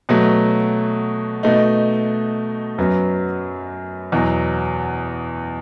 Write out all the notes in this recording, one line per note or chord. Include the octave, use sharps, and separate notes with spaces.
B2 F#3 A3
B2 A3 D#4
F#2 F#3 B3
E2 B2 F#3